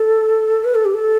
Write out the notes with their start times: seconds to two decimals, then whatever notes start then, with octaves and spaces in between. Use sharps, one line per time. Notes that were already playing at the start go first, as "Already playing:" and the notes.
Already playing: A4
0.65 B4
0.75 A4
0.85 G4
0.94 A4